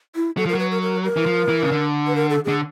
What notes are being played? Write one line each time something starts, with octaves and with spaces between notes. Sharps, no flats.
E4
F#3 A4
F3 A#4
F#3 B4
A#4
A#4
A#4
E3
F3
E3
C#3
D3
B4
A#4
A4
D3 G#4